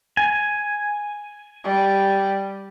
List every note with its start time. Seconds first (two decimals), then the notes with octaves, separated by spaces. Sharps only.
0.17 G#5
1.64 G3